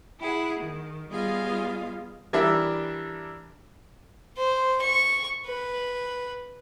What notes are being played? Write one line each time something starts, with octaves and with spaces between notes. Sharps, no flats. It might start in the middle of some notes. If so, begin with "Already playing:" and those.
E4 G#4 F#5
D#3
G3 B3 F4 G#4 D#5 F5
E3 G3 D4 A#4 E5
C5
C#6
B4